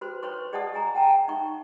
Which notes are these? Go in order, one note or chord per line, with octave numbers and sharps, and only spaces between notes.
F#4 B4 C5 C6
B4 C#5 C6 C#6
G#4 D5 D#5 F#5 A5 D#6
D#5 G#5 A#5
F#5 G5 A5 A#5
D#4 E5 C#6